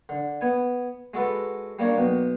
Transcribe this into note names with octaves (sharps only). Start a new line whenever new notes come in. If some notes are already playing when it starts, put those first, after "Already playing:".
D3
B3 G#5
G#3 F#4 A4 B4
G3 A#3 D4 C#5
B1 B2